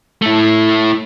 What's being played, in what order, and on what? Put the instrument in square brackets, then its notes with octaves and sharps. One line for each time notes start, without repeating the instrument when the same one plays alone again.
[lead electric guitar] A3 E4